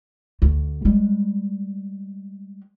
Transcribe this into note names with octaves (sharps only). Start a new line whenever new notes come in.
D2 A3
G3 G#3